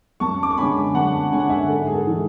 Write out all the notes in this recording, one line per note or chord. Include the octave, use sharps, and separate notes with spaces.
F#2 A5 C#6
D6
C#6
D3 G#3 C#4 G#5 B5
F#2 F#5 A5
D3 G#3 C#4 G#5
F#5
E5 G#5
G#2 A4
G#4
A4
E3 G#3